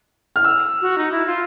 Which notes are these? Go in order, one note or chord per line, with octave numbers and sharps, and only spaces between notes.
F6
E6
F#4
D#4
E4
F4